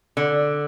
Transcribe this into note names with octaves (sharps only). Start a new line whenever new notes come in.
D3